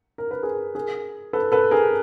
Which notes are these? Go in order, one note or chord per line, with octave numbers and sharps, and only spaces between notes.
A#4
B4
G#4 A#4
G#4 A#4
A4 B4
A4 B4
G#4 A#4